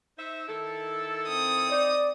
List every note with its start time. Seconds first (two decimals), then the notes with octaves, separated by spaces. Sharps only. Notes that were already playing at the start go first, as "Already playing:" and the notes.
0.19 D#4 C5 E5
0.48 D#3 E4 A4
1.28 C4 D#6
1.71 D#4 D5